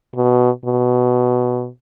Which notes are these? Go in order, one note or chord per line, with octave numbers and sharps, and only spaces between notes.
B2
B2